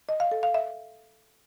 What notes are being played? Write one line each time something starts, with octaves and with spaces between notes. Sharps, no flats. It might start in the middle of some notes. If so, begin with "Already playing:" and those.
D#5
F5
A4
F5
E5